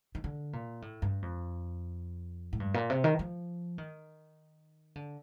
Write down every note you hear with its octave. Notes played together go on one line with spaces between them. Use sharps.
D#3
D3
A#2
A2
G2
F2
A2
G2
A#2
C3
D#3
F3
D#3
D3